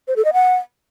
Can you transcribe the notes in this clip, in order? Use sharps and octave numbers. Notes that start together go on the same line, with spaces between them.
C5
A4
D#5
F#5